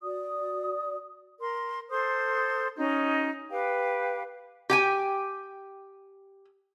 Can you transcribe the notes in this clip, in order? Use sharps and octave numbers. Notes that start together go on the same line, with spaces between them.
F#4 D5 D#6
A#4 C6
A4 C5 C6 D#6
C#4 D#4 F#4
G4 B4 F5 G5
G4 G5 G#5